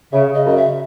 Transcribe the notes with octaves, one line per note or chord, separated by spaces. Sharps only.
C#3 E5
C#3 D#5
F#2 D#5
E5